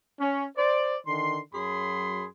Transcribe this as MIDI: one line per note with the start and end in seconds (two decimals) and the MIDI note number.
0.20 0.45 61
0.57 0.97 72
0.57 0.97 74
1.07 1.39 50
1.07 1.39 51
1.07 1.39 84
1.53 2.26 42
1.53 2.26 54
1.53 2.26 68
1.53 2.26 83
1.53 2.26 84